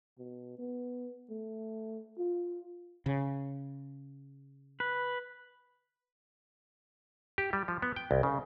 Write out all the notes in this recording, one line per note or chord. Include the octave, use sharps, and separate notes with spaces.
B2
B3
A3
F4
C#3
B4
G4
G3
F3
B3
G5
C2
C#3